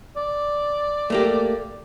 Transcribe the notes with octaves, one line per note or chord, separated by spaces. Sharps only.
D5
A3 A#3 G4